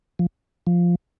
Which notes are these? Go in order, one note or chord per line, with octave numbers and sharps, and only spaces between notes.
F3
F3